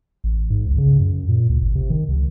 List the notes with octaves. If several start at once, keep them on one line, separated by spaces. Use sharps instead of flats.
A1
G#2
C#2
C#3
F#2
A#2
D2
G#1
C3
D#3
C#2